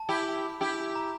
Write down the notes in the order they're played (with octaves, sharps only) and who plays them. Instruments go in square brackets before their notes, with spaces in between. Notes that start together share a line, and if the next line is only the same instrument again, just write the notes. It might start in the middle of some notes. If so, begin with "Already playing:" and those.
Already playing: [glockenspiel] A5
[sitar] E4 G4
E4 G4
[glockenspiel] A#5